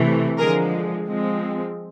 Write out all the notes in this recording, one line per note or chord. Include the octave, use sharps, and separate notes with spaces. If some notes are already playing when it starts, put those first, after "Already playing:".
Already playing: C3 E3 A3
D3 F3 G#3 G#4 A#4
F3 G#3 C4